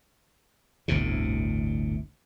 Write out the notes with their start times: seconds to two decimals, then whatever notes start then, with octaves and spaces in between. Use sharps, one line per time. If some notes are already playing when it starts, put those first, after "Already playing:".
0.88 G1 D2 A2 C3